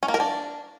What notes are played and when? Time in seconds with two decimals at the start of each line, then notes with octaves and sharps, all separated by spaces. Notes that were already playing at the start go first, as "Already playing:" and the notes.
0.03 C#4
0.08 A#3
0.14 A#4
0.20 D4